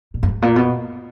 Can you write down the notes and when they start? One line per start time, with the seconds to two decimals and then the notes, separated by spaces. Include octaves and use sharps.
0.14 A#2
0.23 F#2
0.29 G#2
0.42 A#2
0.56 B2